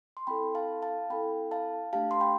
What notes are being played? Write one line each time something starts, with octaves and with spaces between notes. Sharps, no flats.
C6
C4 E4 A4 G5 B5
F5 A5
F5 A5
C4 E4 A4 G5 B5
F5 A5
A3 D4 G4 F5 A5
C6
G5 B5